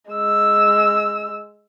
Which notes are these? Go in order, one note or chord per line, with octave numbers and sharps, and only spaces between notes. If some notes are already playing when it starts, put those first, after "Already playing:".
G#3 E6